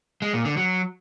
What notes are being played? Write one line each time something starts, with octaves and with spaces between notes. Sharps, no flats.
G#3
A#2
D3
F#3